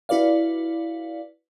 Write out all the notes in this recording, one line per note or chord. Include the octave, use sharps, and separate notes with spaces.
E4 F#4 B4 D5 F5